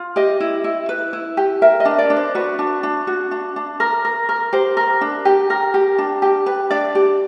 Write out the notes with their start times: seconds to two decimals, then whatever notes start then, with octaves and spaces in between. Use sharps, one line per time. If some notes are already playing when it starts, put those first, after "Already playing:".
Already playing: F4
0.16 G4 D#5
0.40 E4
0.64 E4
0.89 B4
1.13 E4
1.37 G4
1.62 A#4 E5
1.80 D#5
1.85 D4
1.98 D5
2.10 D4
2.16 C5
2.35 F#4 B4
2.59 D4
2.83 D4
3.07 F#4
3.31 D4
3.56 D4
3.80 A#4
4.05 A#4
4.29 A#4
4.53 G4 C5
4.77 A#4
5.01 D4
5.25 G4
5.50 A#4
5.74 G4
5.98 D4
6.22 G4
6.46 B4
6.70 D4 D5
6.95 G4